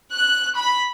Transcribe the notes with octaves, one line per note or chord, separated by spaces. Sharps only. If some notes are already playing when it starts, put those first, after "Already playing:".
F#6
B5